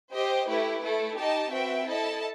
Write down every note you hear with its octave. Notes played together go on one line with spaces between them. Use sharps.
G4 C5 D#5
A3 E4 G4 B4
A3 E4 A4
D#4 G4 D#5 A5
C4 F#4 B4 E5 G5
E4 A4 D#5 A5